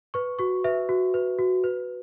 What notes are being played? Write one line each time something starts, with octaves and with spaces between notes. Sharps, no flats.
B4 C#6
F#4 C#6
B4 E5
F#4
B4
F#4
B4